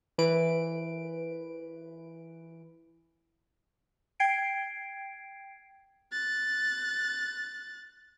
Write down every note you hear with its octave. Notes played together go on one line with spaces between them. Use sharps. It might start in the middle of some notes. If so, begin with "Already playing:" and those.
E3 B4 D7
G5 G#6 C7 D7
F#6 A6